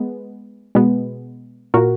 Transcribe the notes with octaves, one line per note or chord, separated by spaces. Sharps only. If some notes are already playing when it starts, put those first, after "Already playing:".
Already playing: G#3 B3
B2 G#3 B3
A#2 A#3 F#4 A#4